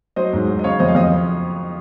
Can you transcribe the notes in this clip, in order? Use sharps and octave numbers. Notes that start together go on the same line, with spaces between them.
F#3 C5 D#5
G#2
F#3
D#5
C#3 C#5 F5
F2 C5 D#5
F5
F2 C5 D#5